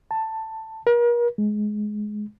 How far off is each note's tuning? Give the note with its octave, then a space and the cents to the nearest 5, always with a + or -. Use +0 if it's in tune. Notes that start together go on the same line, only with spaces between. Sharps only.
A5 +10
A#4 +40
G#3 +15